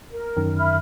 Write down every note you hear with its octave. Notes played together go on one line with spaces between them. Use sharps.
A#4
F#2 D#3
E5 B5 F6